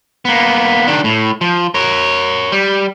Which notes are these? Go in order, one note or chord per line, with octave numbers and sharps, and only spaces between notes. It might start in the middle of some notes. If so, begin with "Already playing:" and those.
A#3 B3
D#3 D4
A2
F3
A#4 C#5
G3